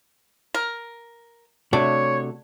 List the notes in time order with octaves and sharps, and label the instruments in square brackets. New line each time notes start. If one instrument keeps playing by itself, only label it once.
[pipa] A#4
[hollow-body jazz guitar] C3 A3 F#4 [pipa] D4 [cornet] C#5